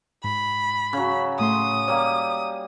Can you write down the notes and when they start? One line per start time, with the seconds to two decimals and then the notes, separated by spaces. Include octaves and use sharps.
0.24 G#2 B5
0.93 C#3 F#3
1.39 A2 A3 C6 D#6
1.88 G3 A#3 C#5